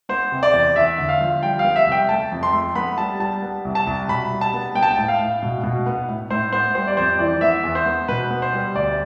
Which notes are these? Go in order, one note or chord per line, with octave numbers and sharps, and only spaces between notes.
B3 C5
C3
D5
E2
E2 E5
D3
F5
F3
G3 G5
F5
B3
E5
C2 G5
A3 A5
F2
C6
A3
B3 B5
G3 A5
G3 A5
B3
C2
A5
C2
B2 B5
G3
A5
B3
B3 G5
A5
G5
A2
F5
A2
B2
B2
B3
A2
A2 C5
B3 C5
G3 C5
D5
F2 C5
E3 D5
B3 E5
E2
C5
B3
B2 B4
B3
C5
G3
D2 D5